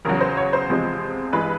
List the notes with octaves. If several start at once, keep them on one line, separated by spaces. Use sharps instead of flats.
E2 C#3 F#3 A#4
C5
C#5
C5
E2 C3 F3 G#3
G2 E3 G#3 B4